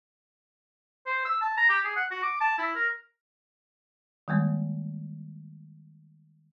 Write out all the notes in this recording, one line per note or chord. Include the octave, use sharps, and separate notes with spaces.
C5
E6
A5
A#5
G4
G#4
F#5
F#4
D6
A5
E4
A#4
D#3 G3 G#3 A#3